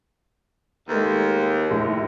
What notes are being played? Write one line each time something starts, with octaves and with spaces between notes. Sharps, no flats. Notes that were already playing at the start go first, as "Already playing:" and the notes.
D#2 G#3 A3 B4
A#1 D#2 A2